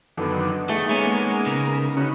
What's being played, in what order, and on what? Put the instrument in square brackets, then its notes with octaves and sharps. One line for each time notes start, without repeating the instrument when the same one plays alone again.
[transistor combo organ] F#2 D3 D#3 [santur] B3 A4
[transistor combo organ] D#3 C#6 [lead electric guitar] A3 [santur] D#4 G#4 D#6
[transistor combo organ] G#3 A#3 [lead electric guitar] B3 C#4
[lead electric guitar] C#3 [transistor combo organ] A#4
[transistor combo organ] C#4 D#4 F#4 [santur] D#5 B5